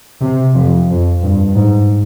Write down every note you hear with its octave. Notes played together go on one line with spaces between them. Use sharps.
C3
F2
F2
G2
G#2